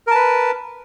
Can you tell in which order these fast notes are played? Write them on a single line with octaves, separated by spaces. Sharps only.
A#4 A5 B4